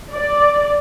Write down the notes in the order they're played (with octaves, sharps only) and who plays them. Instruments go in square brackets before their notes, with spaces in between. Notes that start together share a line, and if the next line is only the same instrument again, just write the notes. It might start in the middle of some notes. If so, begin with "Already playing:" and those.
[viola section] D5